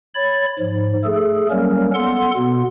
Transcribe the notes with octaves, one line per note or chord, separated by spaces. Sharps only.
C#5 B5 A6
G#2 F3
A3 G#4 A4
F#3 G3 A#3 C#4 A#4
B3 A4 F#5 C6
B2 B3